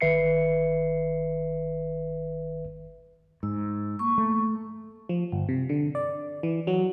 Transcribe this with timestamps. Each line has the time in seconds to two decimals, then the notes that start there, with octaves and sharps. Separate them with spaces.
0.01 G1 D#3 B4 E5 C7 C#7
3.43 G#2 E6
3.99 A#3 C#6
4.18 A3
5.09 F3
5.32 G1
5.49 C3
5.69 D3
5.95 D5
6.43 E3
6.67 F#3